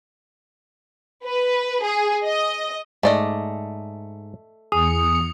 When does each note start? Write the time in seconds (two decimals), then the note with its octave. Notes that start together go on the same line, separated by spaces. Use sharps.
1.25 B4
1.83 G#4
2.25 D#5
3.03 G#2 A3 D5 D#5
4.72 E2 G#4 D#6 C#7